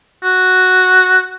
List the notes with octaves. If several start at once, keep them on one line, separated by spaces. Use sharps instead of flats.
F#4